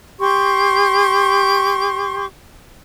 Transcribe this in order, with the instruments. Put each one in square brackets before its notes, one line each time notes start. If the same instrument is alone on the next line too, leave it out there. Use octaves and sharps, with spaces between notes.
[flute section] G4 C6 C#6